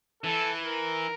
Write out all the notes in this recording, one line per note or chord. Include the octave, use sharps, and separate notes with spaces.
E3 A4
A#4